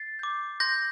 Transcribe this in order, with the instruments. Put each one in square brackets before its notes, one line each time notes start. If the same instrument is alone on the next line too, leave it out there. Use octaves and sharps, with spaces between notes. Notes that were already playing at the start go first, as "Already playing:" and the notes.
Already playing: [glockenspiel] A6 C7
D6 G6
C6 G6 A#6